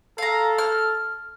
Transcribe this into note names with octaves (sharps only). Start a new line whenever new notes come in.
A4 F5 A#5
F6